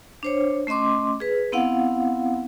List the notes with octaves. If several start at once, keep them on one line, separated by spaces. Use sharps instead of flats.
D4 C5 C#5
A3 C#4 D#5 C6 D6
G#4 B4
B3 C4 E4 F5 F#5